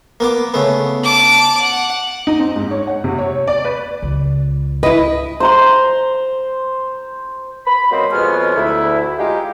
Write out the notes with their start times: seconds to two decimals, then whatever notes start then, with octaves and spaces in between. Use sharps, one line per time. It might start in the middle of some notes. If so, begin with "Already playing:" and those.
0.20 A#3 B3 D6
0.54 C#3 A3 B3
1.04 A5 D6
1.61 F#5
2.27 D#4
2.39 C4
2.56 G#2
2.71 C#5
2.87 F#5
3.04 C3
3.19 C#5
3.47 D5
3.65 B4
4.02 C#2
4.83 E4 B4 D#5
5.40 C5 A#5 C6
7.67 B5
7.92 B2 F#3 A#3 C4 C5 D#5
8.12 F2 B2 G#3 B3 C#5 F6
8.56 D2 E4
9.18 G#3 D#4 F4 G4